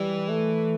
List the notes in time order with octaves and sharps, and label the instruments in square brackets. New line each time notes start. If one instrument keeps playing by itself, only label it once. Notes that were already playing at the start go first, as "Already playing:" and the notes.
Already playing: [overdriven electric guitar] E3 [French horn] G3
[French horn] A3